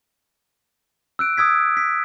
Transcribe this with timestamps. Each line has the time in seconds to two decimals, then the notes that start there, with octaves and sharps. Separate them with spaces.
1.19 E6 F#6 D7
1.37 D#6 E6 G#6 B6
1.77 B6